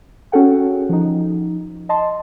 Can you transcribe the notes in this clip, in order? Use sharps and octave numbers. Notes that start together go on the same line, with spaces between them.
C#4 F#4 G#4 A4 F#5 G5
F3 D#4
D#5 A5 C6